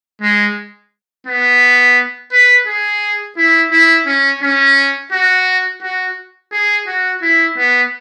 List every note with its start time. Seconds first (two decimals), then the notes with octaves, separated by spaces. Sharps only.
0.22 G#3
1.27 B3
2.32 B4
2.67 G#4
3.38 E4
3.72 E4
4.07 C#4
4.42 C#4
5.12 F#4
5.82 F#4
6.52 G#4
6.87 F#4
7.22 E4
7.57 B3